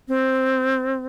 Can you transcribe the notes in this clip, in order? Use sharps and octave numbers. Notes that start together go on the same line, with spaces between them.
C4